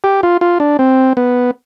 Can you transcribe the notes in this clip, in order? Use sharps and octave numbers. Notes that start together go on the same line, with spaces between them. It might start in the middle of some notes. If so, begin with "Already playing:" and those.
G4
F4
F4
D4
C4
B3